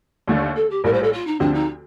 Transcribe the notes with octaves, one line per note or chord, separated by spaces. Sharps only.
D#2 D3 A3 D4
A4
G4
A#1 A2 G3 A#4
C5
A4
F4
D#4
D2 D3 F3 C4 D4 G4
D#4